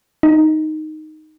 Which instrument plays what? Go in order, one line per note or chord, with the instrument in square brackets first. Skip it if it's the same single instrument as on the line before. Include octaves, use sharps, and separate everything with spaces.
[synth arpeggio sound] D#4